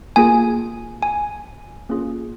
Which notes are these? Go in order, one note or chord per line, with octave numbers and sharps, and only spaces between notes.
A#3 F4 G#4 G#5
G#5
A#3 C#4 F4 G#4